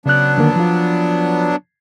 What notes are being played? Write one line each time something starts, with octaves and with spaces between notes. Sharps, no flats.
C#3 F#3 B3 D4 F#6
D3 D#3 A#3
F3 F4